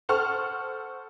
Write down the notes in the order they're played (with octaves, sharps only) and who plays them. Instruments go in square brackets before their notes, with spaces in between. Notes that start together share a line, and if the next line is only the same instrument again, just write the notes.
[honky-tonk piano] A4 C5 F#5 C#6 F6